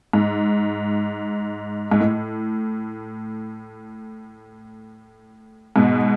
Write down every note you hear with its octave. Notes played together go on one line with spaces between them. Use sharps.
G#2
G#2
A2
G#2 B2